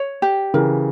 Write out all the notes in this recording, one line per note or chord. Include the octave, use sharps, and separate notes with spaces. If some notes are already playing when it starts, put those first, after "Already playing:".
Already playing: C#5
G4
C#3 E3 A#4